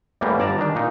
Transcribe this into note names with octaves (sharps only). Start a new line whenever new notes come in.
E2 A2 E3 G3 A#3
G1 G2 D5 A5 A#5
D#3 D4
A#2 D#4